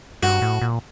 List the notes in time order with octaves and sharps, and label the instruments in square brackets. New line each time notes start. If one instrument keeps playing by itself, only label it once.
[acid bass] G2 [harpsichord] F#4
[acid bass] A2
A#2